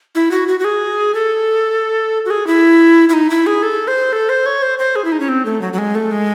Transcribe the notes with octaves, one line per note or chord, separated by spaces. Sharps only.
E4
F#4
F#4
F#4
G#4
A4
F#4
G#4
E4
E4
D#4
E4
G#4
A4
C5
A4
C5
C#5
C5
C5
G#4
E4
D#4
C#4
C4
A3
F#3
F#3
G#3
A3
G#3